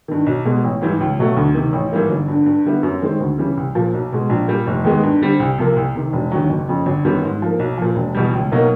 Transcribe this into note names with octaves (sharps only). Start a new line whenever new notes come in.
G2 D#3
B1
B2 G#3 B3
A1
G#2 E3 G3
C#2
B2 F#3 A3
D2
C3 D#3
A1
G#2 E3 G3 A#3
G1
G2 D3
G2
D3 G3 B3 E4
F#2
D#3 G#3 C4
D2
C#3 E3 G3
C2
A#2 F3
B1
B2 G#3
A#1
A#2 G3
F1
D#2 D#3 G#3 B3
G2
D3 G3 C4
C2
C3 F3 A#3
C2
C3 D#3
E1
D#2 D3 F#3
F#1
F2 C#3
G1
F#2 D#3 G3 B3
G#2
F3 A#3
B1
A#2 F3
E1
E2 B2 G3
C#2
B2 F#3 A#3 D#4